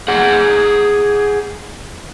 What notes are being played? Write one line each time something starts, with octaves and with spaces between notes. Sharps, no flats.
G#4 F#5